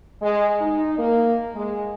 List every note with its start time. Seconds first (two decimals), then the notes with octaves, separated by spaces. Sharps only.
0.21 G#3
0.61 D#4
0.98 A#3
1.54 G#3